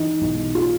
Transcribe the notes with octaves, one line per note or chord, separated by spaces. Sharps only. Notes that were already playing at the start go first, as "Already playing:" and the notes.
Already playing: E3 D#4
B1
F4